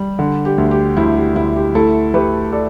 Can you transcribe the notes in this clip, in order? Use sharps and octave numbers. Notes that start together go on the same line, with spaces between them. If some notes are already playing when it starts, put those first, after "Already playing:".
Already playing: G3
D3
G4
D2
G4
D2 E4
G4
D2 E4
G4
A3 E4 A4
A3 G4 B4
A4 D5